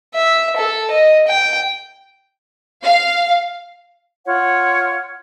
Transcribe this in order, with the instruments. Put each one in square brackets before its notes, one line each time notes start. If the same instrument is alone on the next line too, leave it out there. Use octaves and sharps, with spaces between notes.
[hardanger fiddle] E5
A4
D#5
G5
[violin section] F5
[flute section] F4 C#5 F#5